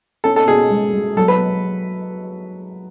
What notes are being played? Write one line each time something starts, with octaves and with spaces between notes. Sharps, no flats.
C#4 A4
A4
F#4 G#4
G#3
G#3
F#3 A4
B4